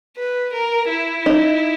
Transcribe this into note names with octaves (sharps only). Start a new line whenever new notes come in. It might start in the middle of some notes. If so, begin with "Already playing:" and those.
B4
A#4
E4
D#4